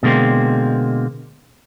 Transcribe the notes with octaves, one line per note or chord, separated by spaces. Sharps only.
B2 D3 G#3 A#3 C4